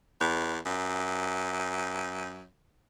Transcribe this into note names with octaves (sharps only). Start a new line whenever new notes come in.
E2
F#2